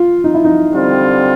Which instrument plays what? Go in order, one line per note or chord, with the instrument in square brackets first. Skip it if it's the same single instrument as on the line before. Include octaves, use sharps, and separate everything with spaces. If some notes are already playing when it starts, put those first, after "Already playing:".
Already playing: [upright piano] F4
D#4
E4
D#4
[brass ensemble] D3 G3 C4 F4